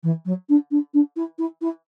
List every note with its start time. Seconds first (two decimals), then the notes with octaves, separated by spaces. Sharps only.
0.03 E3
0.25 F#3
0.49 D4
0.71 D4
0.93 D4
1.16 E4
1.38 E4
1.61 E4